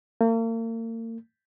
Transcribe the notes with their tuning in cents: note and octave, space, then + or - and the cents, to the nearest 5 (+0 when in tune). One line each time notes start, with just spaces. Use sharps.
A#3 -40